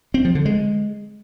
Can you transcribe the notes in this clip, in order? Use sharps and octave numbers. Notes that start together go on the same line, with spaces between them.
C4
F3
D3
G#3